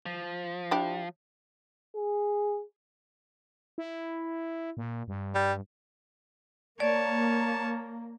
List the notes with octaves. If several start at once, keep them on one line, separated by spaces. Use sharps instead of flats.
F3
D4 E4 G4
G#4
E4
A#2
G2
G3
A#3 C#5 D5 A5